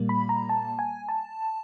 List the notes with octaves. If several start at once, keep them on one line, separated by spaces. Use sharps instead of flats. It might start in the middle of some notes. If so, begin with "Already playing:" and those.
Already playing: A#2 G3 A#3
B5
A#5
A5
G#5
A5